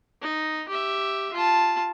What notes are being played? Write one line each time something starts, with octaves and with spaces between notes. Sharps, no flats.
D#4
G4 E5
F4 A5